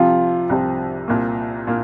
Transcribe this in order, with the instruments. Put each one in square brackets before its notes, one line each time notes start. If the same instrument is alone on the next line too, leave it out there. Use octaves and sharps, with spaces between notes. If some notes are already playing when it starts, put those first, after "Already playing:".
Already playing: [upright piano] C2 C3 F3 [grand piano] F4
[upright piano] C2 C3 F3
C2 A#2 A#3
A#2 A#3